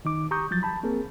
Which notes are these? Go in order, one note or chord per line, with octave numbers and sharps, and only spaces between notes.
D#3 D#4 D6
G4 A#5 C#6 D#6 G6
F3 F#3 G6 A6
A5 B5
A#3 C4 G#4 A#4